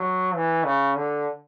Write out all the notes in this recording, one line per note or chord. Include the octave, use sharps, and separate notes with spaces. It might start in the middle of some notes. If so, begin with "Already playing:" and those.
Already playing: F#3
E3
C#3
D3